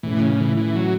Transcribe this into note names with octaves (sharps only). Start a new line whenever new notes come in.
A2 E3 A3 C#4
C#3
E3
E3
F#3